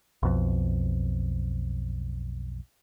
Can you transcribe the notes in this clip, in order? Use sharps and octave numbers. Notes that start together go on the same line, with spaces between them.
B1 F2